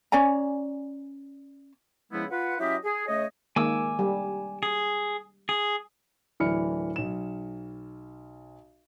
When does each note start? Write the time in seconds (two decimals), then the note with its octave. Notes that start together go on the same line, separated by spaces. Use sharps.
0.12 C#4 D5 G#5 A#5
2.12 C#3 F3 G#3 B3 E4
2.31 F4 B4 F#5
2.59 F#3 C#4 E4 G4 D#5 E5
2.85 G#4
3.08 C#3 A3 C#5 D#5
3.56 D#3 G#3 A#3 G#5 D6 E6
3.99 G3
4.63 G#4
5.49 G#4
6.40 D1 E3 D4 B5 F6 C#7
6.96 B1 E7